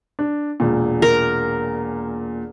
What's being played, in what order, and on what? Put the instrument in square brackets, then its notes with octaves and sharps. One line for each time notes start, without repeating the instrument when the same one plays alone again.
[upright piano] D4
E1 A#2
[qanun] A#4